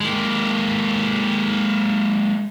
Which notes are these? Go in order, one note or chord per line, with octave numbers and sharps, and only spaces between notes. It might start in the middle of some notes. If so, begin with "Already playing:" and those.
G#3 A#3